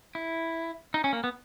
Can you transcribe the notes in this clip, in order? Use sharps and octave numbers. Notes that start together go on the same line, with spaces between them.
E4
D#4
C#4
A#3
B3